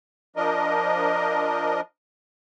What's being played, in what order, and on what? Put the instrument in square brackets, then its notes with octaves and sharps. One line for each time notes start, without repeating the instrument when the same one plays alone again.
[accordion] F3 D4 A#4 D#5